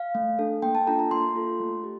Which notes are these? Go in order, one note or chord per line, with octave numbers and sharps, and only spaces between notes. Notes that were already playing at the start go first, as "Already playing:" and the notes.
Already playing: F5
A3
D4 A4
A#3 G5
A5
D4 F4 A4 A#5
A#5
A#3 C6
F4 A4
A3
G4